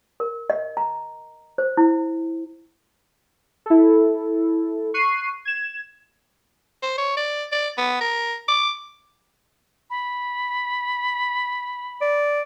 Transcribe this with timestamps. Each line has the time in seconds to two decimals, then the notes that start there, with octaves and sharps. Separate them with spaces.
0.20 A#4
0.50 D#5
0.77 A#5
1.58 C5
1.77 E4
3.66 E4 A4
4.94 C#6 F#6 C7 D#7
5.45 G#6 E7
6.82 C5
6.98 C#5
7.17 D5
7.52 D5
7.78 B3
8.01 A#4
8.48 D6
9.90 B5
12.01 D5